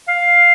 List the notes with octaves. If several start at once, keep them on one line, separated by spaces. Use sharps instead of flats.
F5